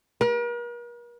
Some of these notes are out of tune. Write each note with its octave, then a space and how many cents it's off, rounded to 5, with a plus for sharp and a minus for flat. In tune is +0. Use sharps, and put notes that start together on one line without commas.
A#4 +45